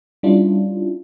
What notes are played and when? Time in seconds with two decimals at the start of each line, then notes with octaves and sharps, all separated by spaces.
0.23 G3 C#4 D4 E4 F4